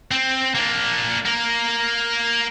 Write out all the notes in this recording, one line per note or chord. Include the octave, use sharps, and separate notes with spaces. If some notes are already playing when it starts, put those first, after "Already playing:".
C4
A#3 D4
A#3 A#4